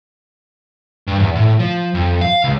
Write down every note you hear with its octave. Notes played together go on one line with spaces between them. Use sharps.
G2
E2
A2
F3
F2
F5
C#2